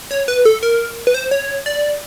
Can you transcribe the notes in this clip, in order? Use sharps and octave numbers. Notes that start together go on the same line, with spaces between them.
C#5
B4
A4
A#4
B4
C5
C#5
D5